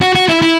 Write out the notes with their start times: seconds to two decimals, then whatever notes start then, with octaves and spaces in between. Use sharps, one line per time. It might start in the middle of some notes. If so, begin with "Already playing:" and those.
0.01 F#4
0.15 F#4
0.29 E4
0.42 E4